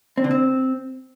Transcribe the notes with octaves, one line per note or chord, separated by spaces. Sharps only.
C4
D3
C4